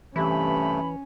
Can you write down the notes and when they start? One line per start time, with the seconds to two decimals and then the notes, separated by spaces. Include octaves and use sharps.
0.16 G2 C3 E3 A3 C#4 B5